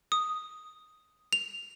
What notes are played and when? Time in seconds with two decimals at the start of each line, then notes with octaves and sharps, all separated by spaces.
0.12 D#6
1.33 F7